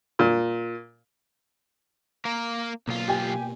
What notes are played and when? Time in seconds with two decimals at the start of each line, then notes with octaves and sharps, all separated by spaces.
0.19 A#2
2.25 A#3 A#4
2.88 B1 B2 A#3 F4
3.08 G4 G#5